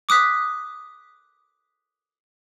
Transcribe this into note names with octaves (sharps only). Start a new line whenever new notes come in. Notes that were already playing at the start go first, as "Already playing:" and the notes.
D6 D#6 F#6 B6